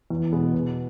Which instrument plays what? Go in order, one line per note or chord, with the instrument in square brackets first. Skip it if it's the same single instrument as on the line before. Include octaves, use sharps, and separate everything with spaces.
[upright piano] E2
B2 G#3 B3
B2